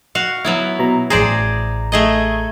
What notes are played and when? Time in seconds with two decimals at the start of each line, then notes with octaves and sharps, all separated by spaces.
0.15 F#4 F5
0.45 F#3 B3 E4
0.79 B2 A#5
1.10 A1 G#4 C5 D5 A#5
1.92 A3 G#4 D#5